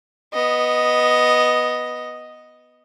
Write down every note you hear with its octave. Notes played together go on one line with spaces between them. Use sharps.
B3 D#5